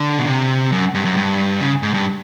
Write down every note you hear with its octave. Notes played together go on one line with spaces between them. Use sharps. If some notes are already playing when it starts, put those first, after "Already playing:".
Already playing: D3
B2
C3
F#2
G2
F#2
G2
C#3
G#2
G2